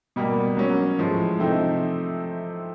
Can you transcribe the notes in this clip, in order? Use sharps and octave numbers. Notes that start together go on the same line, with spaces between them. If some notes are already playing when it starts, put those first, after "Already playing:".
B2 G3 A#3
F#3 A#3 C#4
A2 F3 G#3
C3 F3 A3 C4 D#4